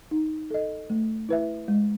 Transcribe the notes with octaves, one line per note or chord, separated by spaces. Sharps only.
D#4
A4 D#5
A3
E4 B4 E5
G#3